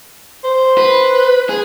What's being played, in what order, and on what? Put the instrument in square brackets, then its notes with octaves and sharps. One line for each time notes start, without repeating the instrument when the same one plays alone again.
[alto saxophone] C5
[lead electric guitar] B4
G#4